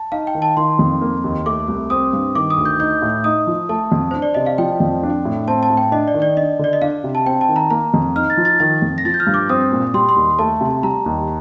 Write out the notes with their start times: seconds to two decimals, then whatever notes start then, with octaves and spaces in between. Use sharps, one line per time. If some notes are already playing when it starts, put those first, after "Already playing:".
Already playing: A5
0.12 D#4 F5
0.27 G5
0.35 D#3
0.42 A5
0.57 D#3 C6
0.79 F2
1.01 A#3
1.24 D#2
1.46 A3 D6
1.68 C2
1.90 C4 D#6
2.13 G2
2.35 D#3 D6
2.50 D#6
2.58 D2
2.65 G6
2.80 D#4 G6
3.02 A2
3.24 D#4 D#6
3.47 F3
3.69 A3 A5
3.92 F2
4.11 D4 C5
4.22 D5
4.34 C3 D#5
4.46 F5
4.58 F3 G5
4.80 F2
5.03 D4
5.25 A2
5.48 C4 A5
5.63 A5
5.70 A2
5.77 G5
5.92 D4 D#5
6.08 D5
6.14 D#3
6.22 D5
6.37 D4 D#5
6.59 D3 D5
6.73 D#5
6.82 D4 F5
7.04 C3
7.15 A5
7.26 C4 G5
7.41 A5
7.49 D#3
7.56 A#5
7.70 A#3 A#5
7.94 F2
8.16 D#4 F6
8.30 A6
8.37 F3
8.45 A6
8.60 D#3 A6
8.82 F2
8.98 A#6
9.05 F3 A6
9.14 G6
9.20 F6
9.27 G2
9.34 D6
9.49 C4 D#6
9.71 A#2
9.94 G3 C6
10.09 C6
10.16 D#2
10.39 A3 A5
10.61 C3
10.83 G3 A#5
11.06 D#2